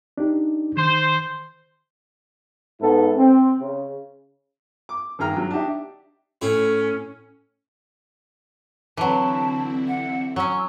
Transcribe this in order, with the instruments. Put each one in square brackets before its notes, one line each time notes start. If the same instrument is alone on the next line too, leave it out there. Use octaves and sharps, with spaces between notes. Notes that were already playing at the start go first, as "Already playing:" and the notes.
[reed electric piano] D4 D#4 G4
[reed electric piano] D#3 G6 [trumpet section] C5
[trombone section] G#2 B3 E4 A4
C4
C#3
[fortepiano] D6
G#1 G2 G#4 G5 A#5 F6
F#3
D4 D#4 G4 E5
[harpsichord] A2 E4 [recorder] C#4
[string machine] D3 C4 E4 [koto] E3 F#3 [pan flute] A5
[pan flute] F#5
[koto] F#3 C#4 [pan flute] E6